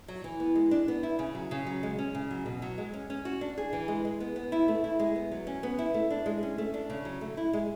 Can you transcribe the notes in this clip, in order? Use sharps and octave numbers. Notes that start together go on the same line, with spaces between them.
F#3
E3
B3
G#3
D4
B3
E4
C#3
F#3
C#3
F#3
G#3
C#4
C#3
F#3
B2
F#3
G#3
C#4
C#4
F#4
D4
G#4
E3
G#3
G#3
B3
B3
E4
A3
E4
G#3
B3
F#3
C#4
B3
E4
A3
D4
G#3
C#4
A3
D4
C#3
F#3
A3
E4
G#3